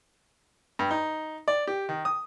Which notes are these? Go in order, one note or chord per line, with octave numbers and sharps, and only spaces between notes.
G2
D#4
D5
G4
D#3
D#6